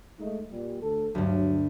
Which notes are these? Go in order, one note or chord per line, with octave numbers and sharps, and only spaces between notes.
G#3 A3 D#4
A#2 G3
D2 A4
D2 G2 F#3